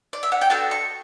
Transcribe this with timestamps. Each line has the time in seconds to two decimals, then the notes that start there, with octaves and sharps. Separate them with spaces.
0.13 D5
0.23 E5
0.32 F#5
0.41 G5
0.50 B3 D4 F#4 A4 A5
0.71 C#6